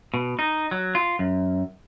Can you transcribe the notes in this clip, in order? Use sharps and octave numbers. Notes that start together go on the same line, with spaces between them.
B2
D#4
F#3
F4
F#2